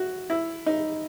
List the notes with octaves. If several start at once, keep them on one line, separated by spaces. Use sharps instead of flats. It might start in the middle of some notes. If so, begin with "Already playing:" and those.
Already playing: F#4
E4
D#4